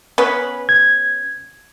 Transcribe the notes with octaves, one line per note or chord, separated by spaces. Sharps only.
B3 C#4 B4
G#6